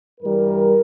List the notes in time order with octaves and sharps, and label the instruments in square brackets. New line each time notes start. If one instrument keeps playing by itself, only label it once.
[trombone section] G2 E3 G3 A#4